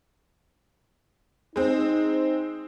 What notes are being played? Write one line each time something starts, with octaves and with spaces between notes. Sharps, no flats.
G#3 C4 D#4